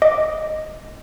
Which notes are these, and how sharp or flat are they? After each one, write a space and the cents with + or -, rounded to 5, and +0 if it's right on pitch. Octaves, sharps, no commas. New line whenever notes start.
D#5 +0 D6 +0